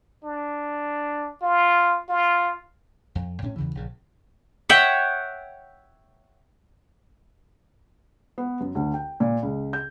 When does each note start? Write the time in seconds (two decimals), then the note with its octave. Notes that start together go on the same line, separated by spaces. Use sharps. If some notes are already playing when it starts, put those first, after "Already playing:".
0.24 D4
1.42 F4
2.09 F4
3.15 F2
3.42 A2 C4 C#4
3.56 E2 C#3 E3
3.75 A#1 C#3
4.69 C#5 E5 F#5 G5
8.38 B3
8.60 F#2
8.75 D2
8.94 G5
9.20 A#2
9.43 C#2
9.73 G6